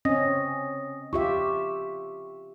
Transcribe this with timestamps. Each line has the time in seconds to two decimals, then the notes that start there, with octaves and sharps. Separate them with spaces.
0.05 C4 C#4 D#5 D#6 A#6
1.13 F4 G4 E5 C#6